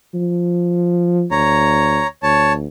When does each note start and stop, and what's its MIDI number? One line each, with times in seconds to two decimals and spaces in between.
0.14 1.26 53
1.31 2.02 38
1.31 2.07 73
1.31 2.07 82
2.23 2.67 38
2.23 2.53 73
2.23 2.53 81